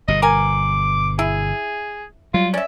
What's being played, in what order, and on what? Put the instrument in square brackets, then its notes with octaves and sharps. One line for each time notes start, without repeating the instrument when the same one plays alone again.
[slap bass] G1 B2 [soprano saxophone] D#5
[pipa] A#4 G#5 [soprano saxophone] D6
[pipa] E4 [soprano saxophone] G#4
[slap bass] F#3 G3 [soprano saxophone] F4
[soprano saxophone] C#4 [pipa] D5 E5